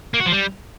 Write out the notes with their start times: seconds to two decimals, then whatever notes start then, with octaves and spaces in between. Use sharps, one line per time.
0.14 A#3
0.20 F#4
0.26 F3
0.32 G3